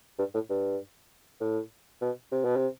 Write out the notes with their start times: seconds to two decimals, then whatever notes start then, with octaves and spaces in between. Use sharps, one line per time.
0.18 G2
0.34 A2
0.50 G2
1.41 A2
2.01 B2
2.32 C3
2.45 B2
2.56 C3